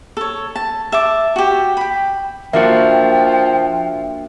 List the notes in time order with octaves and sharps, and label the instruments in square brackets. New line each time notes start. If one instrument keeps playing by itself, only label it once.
[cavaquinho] A4 C#5
A5
E5 A5 D6
F#4 G4
G5 B5
[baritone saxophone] F3 [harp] A#3 D4 F#4 [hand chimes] E5 [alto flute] G5